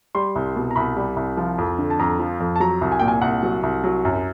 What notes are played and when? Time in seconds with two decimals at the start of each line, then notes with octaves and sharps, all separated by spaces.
0.15 G3 C6
0.36 C2
0.56 B2
0.71 A#5
0.76 C2 B5
0.97 G3
1.17 C2
1.37 F3
1.58 F2
1.79 D3
1.90 A5
1.99 F2 A#5
2.19 F3
2.40 F2
2.56 A5
2.60 F#3 A#5
2.81 C2
2.92 G#5
3.00 A#2 G5
3.08 G#5
3.22 C2 F#5
3.43 F#3
3.63 C2
3.84 F#3
4.05 F#2